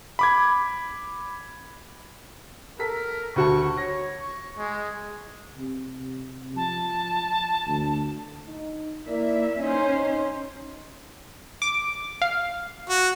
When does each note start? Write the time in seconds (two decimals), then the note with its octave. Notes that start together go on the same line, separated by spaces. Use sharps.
0.19 B5 D6 G#6
2.79 A4 A#4 B6
3.36 D2 F#4 A5 C#6
3.77 C#5 A#6
4.19 C#6
4.57 G#3
5.58 C3
6.56 F3 A5
7.67 D2
8.48 D#4
9.07 A#3 E4 A#4 D5 E5
9.61 C#4 D#4 C5
9.91 D#4
11.62 D6
12.22 F5
12.90 F#4